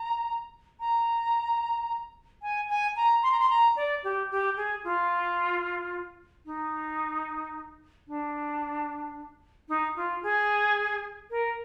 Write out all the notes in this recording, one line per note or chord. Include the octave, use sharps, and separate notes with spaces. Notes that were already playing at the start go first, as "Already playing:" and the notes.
Already playing: A#5
A#5
G#5
G#5
A#5
C6
A#5
C6
A#5
D5
G4
G4
G#4
F4
D#4
D4
D#4
F4
G#4
A#4